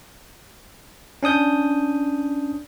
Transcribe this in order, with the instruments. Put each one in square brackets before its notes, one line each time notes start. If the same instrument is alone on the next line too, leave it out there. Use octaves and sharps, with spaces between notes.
[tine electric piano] C#4 D4 D#6 G6